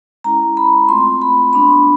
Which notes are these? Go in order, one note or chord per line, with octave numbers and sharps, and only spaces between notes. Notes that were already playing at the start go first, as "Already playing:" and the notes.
G#3 C#4 E4 A#5
B5
A3 C4 F4 C6
B5
G#3 B3 D4 B5